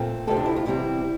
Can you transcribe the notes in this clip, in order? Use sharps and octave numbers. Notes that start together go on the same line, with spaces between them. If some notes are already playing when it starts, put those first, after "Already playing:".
Already playing: A#2 A3 C4
D2 C3 F3 C4 A4
D4
E4
F4
E2 C3 G3 C4 E4